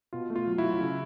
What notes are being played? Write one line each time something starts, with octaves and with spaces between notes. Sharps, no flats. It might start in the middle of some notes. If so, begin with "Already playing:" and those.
B2 F4
A3
F4
F#3
E4 F#4
F#3
C#3